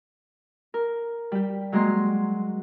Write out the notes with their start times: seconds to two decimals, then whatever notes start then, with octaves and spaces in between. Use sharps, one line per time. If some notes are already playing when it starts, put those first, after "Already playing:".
0.74 A#4
1.32 G3 G4
1.72 F#3 G#3 A#3 A#5 C6